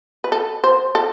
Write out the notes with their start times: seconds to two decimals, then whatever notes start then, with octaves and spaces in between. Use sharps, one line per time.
0.24 B4
0.32 A4
0.64 C5
0.95 A4